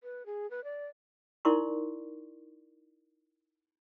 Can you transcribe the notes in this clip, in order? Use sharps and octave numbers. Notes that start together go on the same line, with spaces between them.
B4
G#4
B4
D5
D#4 E4 A#4 D5 C6 C#6